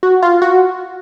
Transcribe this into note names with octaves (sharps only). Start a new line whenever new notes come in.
F#4
F4
F#4